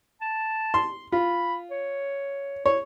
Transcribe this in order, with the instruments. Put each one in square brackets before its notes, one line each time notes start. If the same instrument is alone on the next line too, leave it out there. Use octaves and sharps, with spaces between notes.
[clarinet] A5
[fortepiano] C6
[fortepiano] F4 [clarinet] B5
[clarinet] C#5
[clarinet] E4 [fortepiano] C#5